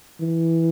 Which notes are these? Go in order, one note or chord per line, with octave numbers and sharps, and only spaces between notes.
E3